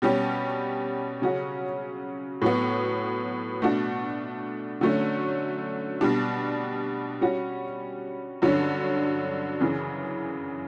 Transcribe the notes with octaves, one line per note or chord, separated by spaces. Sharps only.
B2 G3 C#4 G4
C#3 F#3 C#4 F#4
A2 F#3 B3
B2 A3 D4 F#4
D3 F#3 A3 C#4
B2 G3 D4
G3 C#4 F#4
G2 D3 F#3 C#4
F#2 C#3 E3